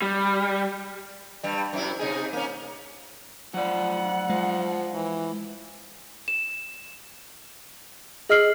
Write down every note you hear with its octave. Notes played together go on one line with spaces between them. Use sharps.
G3
G2 G3
F#2 C3 E4
C3 D#4 G#4
A#3 C#4
F3 F#3 D5 F#5
F3 G#3
E3
E7
G#4 D#5 E6 F6 C7 F#7